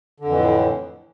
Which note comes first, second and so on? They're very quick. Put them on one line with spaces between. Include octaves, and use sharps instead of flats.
D3 F2 E3 A2